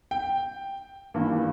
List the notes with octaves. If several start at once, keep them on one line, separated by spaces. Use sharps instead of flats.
G5
G#1 G2 E3 A#3